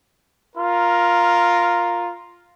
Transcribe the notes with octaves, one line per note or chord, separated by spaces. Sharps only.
F4 A#4